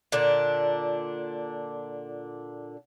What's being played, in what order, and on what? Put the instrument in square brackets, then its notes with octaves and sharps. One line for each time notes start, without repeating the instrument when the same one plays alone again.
[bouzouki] A#2 D3 D4